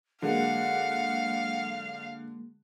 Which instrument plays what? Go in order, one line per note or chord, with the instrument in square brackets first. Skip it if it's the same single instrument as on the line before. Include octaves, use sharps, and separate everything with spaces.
[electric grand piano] D3 [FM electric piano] F#3 G#3 A#3 [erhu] F5 [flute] F#5